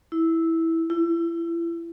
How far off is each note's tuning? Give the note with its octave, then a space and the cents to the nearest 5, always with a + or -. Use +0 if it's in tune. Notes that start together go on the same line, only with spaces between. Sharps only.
E4 -10
E4 +30